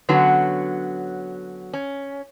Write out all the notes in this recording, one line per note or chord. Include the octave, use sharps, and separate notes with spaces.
D3 F#3 B3 C#4 F#4
C#4